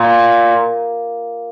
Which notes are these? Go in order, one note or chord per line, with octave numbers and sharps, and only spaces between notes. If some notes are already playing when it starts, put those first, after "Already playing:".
Already playing: A#2